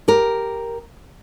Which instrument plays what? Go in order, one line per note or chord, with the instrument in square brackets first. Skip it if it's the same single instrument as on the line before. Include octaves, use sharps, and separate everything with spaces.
[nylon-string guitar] G4 A#4